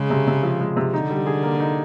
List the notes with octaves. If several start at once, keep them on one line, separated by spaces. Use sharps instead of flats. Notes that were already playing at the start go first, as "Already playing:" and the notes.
Already playing: C#3 G#3
C3
C3
F3
G#3
C3
D3 D#4
G3
G#4
A#3
D#4